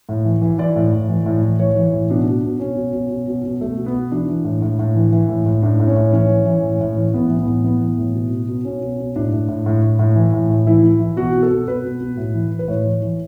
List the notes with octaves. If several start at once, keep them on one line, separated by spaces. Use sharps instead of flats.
A2
E3
E3
E3 D5
A2
A2
E3
A2
E3
E3 C#5
E3
A2
B2 D4
B2
B2
B2 C#4
B2
B2
B2
B2
B2
B2 A3
B2
B3
B2
E3 D4
E3
A2
A2
A2
E3
E3
A2
A2
A2 D4
A2
C#4
A2
E3 C#4
E3
E3
A2
A2
E3
A2 B3
E3
B3
A2
E3 B3
E3
A2
B2
B2
B2
B2 C#4
B2
B2
A2 D4
A2
A2
A2
A2
A2
E3
A2
A2
E3 E4
E3
E3
B2 F#4
B2
A4
B2
B2 B4
B2
B2
A2
E3
E3
B4
A2 C#5
E3
E3